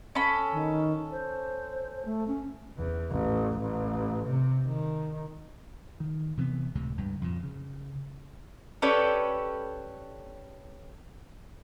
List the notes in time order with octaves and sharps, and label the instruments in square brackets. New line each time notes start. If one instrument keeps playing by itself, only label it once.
[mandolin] C#4 A4 B5
[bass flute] D#3
C5
A3
C#4
[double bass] E2
A1
A1
C3
D#3
[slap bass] D#3
C3 E3 G#3 B3
C#2 A2 C3
C#2 G2
F2 A#2
C#3
[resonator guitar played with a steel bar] C#4 G4 A4 B4 C#5 D5